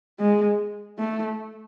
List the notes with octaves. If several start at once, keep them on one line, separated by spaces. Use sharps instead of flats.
G#3
A3